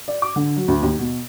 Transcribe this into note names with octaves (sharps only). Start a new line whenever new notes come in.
D5
D6
D3
F#3
D2
D#2
B2